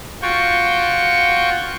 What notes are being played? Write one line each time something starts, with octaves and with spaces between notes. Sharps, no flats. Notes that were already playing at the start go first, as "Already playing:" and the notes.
F4 F#4 G5 C#6